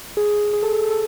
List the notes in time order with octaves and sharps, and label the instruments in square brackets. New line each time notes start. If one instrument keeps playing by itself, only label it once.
[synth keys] G#4
G#4
A4
G#4
A4